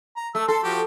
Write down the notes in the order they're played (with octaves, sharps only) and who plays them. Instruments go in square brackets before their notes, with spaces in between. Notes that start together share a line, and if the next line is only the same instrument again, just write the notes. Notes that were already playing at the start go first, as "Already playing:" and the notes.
[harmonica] A#5
[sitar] A3 [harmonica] E6
[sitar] A4 [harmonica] C6
[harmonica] F3 F#4 G4